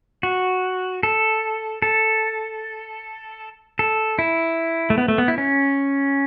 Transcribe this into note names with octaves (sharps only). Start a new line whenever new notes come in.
F#4
A4
A4
A4
E4
A3
B3
A3
B3
E4
C#4